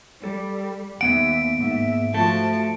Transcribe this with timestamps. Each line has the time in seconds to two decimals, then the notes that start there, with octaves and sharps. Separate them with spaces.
0.24 G3 A4
1.01 D#2 A#3 B3 E5 F#5 D7
1.58 G#2 E5
2.15 F3 A3 F#4 A5